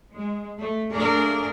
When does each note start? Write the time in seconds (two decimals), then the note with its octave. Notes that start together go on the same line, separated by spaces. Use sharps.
0.12 G#3
0.60 A3
0.94 A3 A#3 D4 G#4 A#4 D5